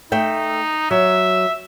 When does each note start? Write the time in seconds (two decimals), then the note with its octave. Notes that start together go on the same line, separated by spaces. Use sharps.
0.12 A3 D#4 E5 G5
0.91 F#3 E5